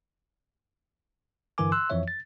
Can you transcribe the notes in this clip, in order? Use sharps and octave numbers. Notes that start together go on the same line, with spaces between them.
G2 D3 E3 A#4 G#5 D6
C6 E6 F#6
F2 E3 F3 C#5 E5
A6